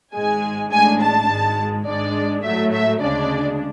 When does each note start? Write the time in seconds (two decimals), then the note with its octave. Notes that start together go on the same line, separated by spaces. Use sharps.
0.14 G#1 G#2 G#3 G#5
0.71 A1 A2 G#3 D4 G#5
1.00 A5
1.29 G#1 G#2 G#3
1.86 G#1 G#2 G#3 D4 D5
2.43 A2 F#3 A3 E5
2.72 E5
3.00 D2 C#3 G#3 D4 D5